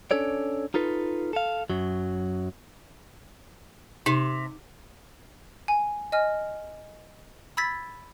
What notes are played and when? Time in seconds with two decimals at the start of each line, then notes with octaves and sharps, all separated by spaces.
0.11 C#4 D4 A4 C#5 D5
0.74 D#4 F4 A4 B4
1.33 A4 F5
1.70 F#2 F#3
4.06 C3 D#4
5.68 G#5
6.12 D#5 G#5 F6
7.57 B5 E6 G#6 A6 B6